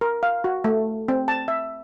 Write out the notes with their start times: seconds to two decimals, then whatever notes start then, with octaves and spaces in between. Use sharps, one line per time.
0.01 A#4
0.23 F5
0.44 F#4
0.64 A3
1.08 C4
1.28 A5
1.48 E5